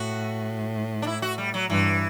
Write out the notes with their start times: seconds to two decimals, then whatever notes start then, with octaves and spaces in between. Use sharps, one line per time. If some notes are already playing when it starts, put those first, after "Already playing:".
Already playing: A2 F#4
1.02 D4
1.07 E4
1.22 F#4
1.38 G3
1.54 F#3
1.69 G2 E3